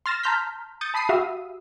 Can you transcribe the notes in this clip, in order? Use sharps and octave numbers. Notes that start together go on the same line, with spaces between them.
C6 F6 A6 A#6 E7
A5 A#5 C6 F6 G6 B6
D#6 G6 A6 C#7
A5 B5 D#6 B6 C7 D#7
F#4 G4 E5 F5 D#6 E6